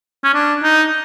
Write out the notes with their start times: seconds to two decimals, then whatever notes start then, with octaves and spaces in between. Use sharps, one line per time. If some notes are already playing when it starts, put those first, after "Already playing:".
0.24 C#4
0.34 D4
0.63 D#4